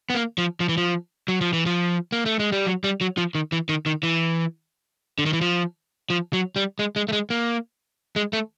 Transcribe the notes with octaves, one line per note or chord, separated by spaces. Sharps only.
B3
A#3
F3
F3
E3
F3
F#3
F3
E3
F3
A#3
A3
G#3
G3
F#3
G3
F#3
F3
D#3
E3
D#3
D#3
E3
D3
D#3
E3
F3
F3
F#3
G3
G#3
G#3
A3
G#3
A#3
G#3
A3